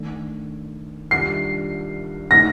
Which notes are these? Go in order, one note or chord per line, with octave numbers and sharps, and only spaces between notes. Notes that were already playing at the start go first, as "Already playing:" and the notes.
Already playing: D#3 A3 D4
D#3 G3 D4 F4 C7
D3 A3 D#4 A#6